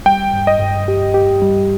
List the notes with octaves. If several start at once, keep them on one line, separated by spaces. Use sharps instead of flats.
G3 G5
G2
D#5
G2
G4
G4
G3